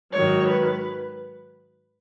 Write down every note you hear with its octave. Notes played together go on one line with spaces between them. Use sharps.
G#2 D#3 F#3 C#5
B4